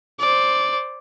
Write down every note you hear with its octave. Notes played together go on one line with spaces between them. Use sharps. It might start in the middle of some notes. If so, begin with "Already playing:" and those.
C5 D5